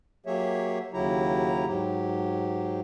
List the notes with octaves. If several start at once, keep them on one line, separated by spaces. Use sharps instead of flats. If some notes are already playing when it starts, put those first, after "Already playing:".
F#3 A#3 G4 G#4 C#5 E5
D#2 C#3 F#3 E4 G4 A#5
G#2 F#3 G4